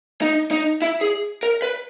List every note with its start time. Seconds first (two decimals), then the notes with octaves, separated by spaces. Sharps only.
0.22 D#4
0.51 D#4
0.82 E4
1.01 G#4
1.43 A#4
1.62 B4